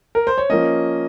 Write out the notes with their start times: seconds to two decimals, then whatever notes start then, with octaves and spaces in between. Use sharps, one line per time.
0.15 A#4
0.27 C5
0.38 C#5
0.50 F3 A#3 C#4 D#5